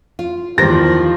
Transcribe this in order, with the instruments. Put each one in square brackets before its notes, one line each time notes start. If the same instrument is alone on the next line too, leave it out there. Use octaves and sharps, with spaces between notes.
[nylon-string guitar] F4
[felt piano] E2 A#6 [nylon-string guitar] D#3 [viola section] F3 [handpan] G4 B4 C5